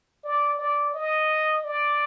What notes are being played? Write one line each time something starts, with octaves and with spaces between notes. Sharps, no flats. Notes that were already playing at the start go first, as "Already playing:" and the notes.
D5
D5
D#5
D5